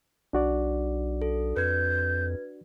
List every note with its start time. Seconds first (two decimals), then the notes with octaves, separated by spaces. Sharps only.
0.33 B1 D4 F#4 D5
1.22 A4
1.57 F2 B4 G6 G#6